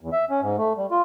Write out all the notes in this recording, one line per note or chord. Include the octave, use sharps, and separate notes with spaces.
E2
E5
C#4
G#2
A3
G3
F4